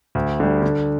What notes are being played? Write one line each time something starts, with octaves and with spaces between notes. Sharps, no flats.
D2
D3 G3
D3